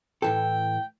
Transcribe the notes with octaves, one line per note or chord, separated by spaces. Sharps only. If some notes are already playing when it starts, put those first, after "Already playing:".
A2 E3 A4 G5